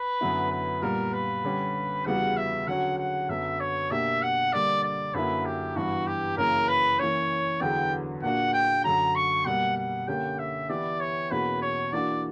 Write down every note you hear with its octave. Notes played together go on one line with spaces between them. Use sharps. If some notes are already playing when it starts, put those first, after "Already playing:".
Already playing: B4
F#2 D3 F#3 B3 E4
B4
A#2 G3 B3 A#4
B4
D3 G3 C#4 G4
E2 C#3 G3 B3 F#4 F#5
E5
D3 F#3 C#4 F#4 F#5
F#5
F#2 D3 F#3 B3 E5
C#5
B2 A#3 D4 G4 E5
F#5
D3 G3 A#3 D5
D5
F#2 D3 F#3 A#3 E4 B4
G4
G2 E3 G3 B3 F#4
G4
F#2 C#3 E3 A#3 C#4 A#4
B4
E3 A#3 C#4 C#5
E2 D3 F#3 B3 G5
A#2 A#3 D4 F#4 F#5
G5
F#2 D3 F#3 A#5
C#6
B2 G3 A#3 F#5
F#5
D3 A#3 C#4 G4 G5
E5
E3 B3 E4 G4 D5
C#5
E2 B2 A#3 C#4 F#4 B4
C#5
E3 A#3 D4 F#4 D5